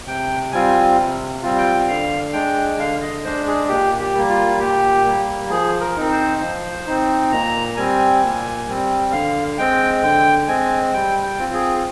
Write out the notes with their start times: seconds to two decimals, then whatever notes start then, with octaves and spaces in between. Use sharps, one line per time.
0.07 C3 G5
0.52 G3 C4 F4 G#5
0.98 C3
1.43 G3 C4 F4
1.58 G5
1.88 D3 F5
2.33 G#3 D4 G5
2.79 D3 F5
3.01 D#5
3.24 G#3 D4 C5
3.47 G#4
3.69 A#2 G4
4.00 G4
4.14 G3 A#3
4.30 F4
4.60 A#2 G4
5.06 G3 A#3
5.50 F3 G#4
5.81 A#4
5.96 C4 D#4
6.11 C5
6.41 F3
6.86 C4 D#4
7.32 A#2 A#5
7.76 G3 C4 G#5
8.22 A#2
8.67 G3 C4
9.12 D3 F5
9.58 G#3 C4 G5
10.02 D3 G5
10.48 G#3 C4 G#5
10.94 G3 G5
11.23 G5
11.39 C4 F4
11.54 G#4